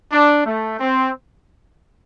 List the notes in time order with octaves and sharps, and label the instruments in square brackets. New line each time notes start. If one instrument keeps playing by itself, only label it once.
[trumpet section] D4
A3
C4